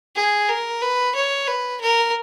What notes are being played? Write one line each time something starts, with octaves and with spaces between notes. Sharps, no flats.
G#4
A#4
B4
C#5
B4
A#4